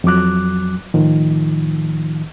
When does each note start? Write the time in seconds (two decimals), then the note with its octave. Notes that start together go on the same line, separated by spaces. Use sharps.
0.04 F2 F#3 D6 F#6
0.94 A2 D#3 F3